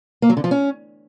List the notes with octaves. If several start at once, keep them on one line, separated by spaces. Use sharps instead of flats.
A#3
F#3
D3
F3
C#4